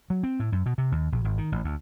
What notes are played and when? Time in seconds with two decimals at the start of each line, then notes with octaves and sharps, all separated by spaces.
0.10 F#3
0.23 C4
0.39 A2
0.52 F#2
0.66 B2
0.78 C3
0.92 D#2
1.12 A#1
1.24 G#1
1.38 D#3
1.52 A1
1.64 D2